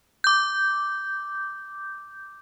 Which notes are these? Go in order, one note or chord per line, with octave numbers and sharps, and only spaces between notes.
D6 G6